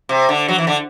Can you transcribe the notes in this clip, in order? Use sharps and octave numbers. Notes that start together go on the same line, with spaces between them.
C3
D3
F#3
E3
D3